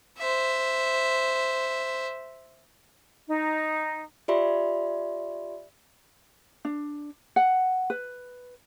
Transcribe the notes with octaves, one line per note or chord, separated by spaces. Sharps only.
C5 E5
D#4
F4 G4 D5 E5 B5 C6
D4
F#5
B4